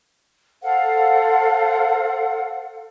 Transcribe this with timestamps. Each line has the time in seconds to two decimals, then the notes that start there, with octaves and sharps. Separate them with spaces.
0.63 A4 C5 F5 F#5